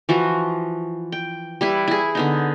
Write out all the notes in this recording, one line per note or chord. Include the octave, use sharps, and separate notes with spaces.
E3 F3 F#4
G5
G3 E4 B4
E4 G#4
D3 B3 D#4